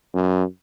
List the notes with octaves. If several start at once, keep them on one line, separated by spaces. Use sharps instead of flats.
F#2